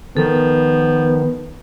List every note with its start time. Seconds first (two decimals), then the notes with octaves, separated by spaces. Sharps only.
0.17 D#3 F3 B3 A4